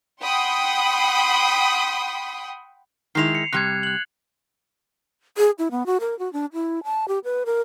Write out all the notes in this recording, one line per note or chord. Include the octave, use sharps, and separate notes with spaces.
F#5 G5 B5 C6 D#6
D#3 G#3 E4 C7 F7
C#7
C3 G3 F#6 G#6
F#6 F#7
G#4
E4
B3
F#4
A#4
F#4
D4
E4
A5
G4
B4
A#4